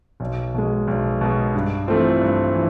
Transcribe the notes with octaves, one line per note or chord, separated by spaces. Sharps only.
B1
B2 G#3
B1
B2 G#3
G2
E3 A3 C4 F4
G2
E3